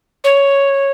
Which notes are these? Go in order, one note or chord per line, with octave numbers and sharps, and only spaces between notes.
C#5